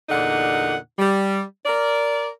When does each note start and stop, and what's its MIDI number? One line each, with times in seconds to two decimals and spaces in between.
0.09 0.76 40
0.09 0.76 46
0.09 0.76 50
0.09 0.76 63
0.09 0.76 78
0.99 1.41 55
1.66 2.27 70
1.66 2.27 74